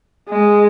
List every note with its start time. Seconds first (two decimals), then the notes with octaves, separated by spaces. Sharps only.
0.29 G#3